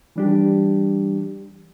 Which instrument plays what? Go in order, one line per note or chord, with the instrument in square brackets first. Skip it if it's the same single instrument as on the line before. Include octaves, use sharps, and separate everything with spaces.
[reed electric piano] E3 G3 D4 G4